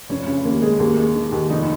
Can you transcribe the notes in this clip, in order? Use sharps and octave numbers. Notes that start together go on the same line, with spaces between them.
F1 C#4
C#3
D#2 A#3
G#3
D#2 A#3
G#3
D#3
D#2
F1 D#4